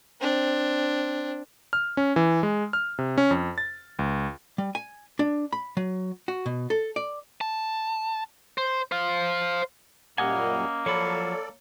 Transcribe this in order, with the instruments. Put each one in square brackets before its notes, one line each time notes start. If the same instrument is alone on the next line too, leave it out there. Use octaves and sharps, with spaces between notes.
[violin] C4 D4
[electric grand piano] F6
C#4
E3
G#3
F6
C3
C#4
F2
A6
C#2
[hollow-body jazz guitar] G3
G#5
D4
B5
F#3
F#4
B2
A4
D5
[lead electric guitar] A5
C5
C5 F5
[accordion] F#2 A#2 G3 [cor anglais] A#3 [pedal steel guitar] C#4 D#5 G#5 [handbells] F#5
[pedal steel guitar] F3 F#3 B5 [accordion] A4 D5 [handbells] C#5 C#7